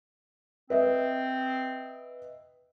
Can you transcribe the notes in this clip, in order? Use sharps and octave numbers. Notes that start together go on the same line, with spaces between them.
C4 B4 D#5 E5